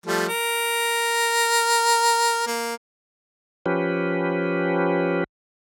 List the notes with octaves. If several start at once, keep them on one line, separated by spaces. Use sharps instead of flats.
F3 G3 A3
A#4
A#3
F3 C#4 G4 B4